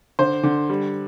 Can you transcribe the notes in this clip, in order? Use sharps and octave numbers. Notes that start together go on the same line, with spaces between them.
D3 C5
D3
G3